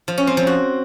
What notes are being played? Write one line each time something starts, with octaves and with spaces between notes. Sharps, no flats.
F3
C#4
C4
F3
F#4